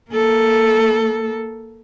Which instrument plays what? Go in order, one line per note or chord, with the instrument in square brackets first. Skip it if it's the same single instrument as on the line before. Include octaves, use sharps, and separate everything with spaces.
[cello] A#3 A4